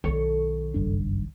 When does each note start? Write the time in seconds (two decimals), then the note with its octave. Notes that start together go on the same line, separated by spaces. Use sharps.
0.04 B1 D#3 A4 C#5
0.74 F#1 G2 D4